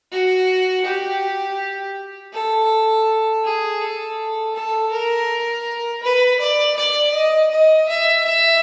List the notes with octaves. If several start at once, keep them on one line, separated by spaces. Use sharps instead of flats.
F#4
G4
A4
G#4
A4
A4
A#4
B4
D5
D5
D#5
D#5
E5
E5